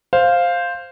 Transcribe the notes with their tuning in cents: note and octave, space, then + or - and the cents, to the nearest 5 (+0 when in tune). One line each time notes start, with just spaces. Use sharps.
C5 +0 F5 +0